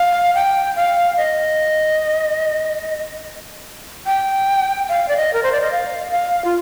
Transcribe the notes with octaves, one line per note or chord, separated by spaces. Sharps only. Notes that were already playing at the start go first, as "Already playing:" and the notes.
Already playing: F5
G5
F5
D#5
G5
F5
D5
D#5
A#4
C5
D5
D#5
F5
F5
F4